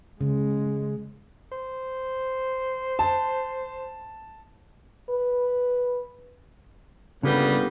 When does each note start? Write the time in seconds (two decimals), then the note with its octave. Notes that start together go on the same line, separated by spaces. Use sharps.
0.21 C#3 G#3
1.52 C5
2.99 A5
5.10 B4
7.23 G1 C#3 G3 A#3 B3